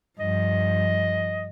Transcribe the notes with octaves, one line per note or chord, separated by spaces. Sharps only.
G2 F3 D#5